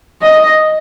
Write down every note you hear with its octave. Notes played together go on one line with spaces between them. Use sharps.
D#5